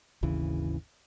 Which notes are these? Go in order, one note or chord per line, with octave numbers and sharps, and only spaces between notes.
G#1 D#2 C#3 E3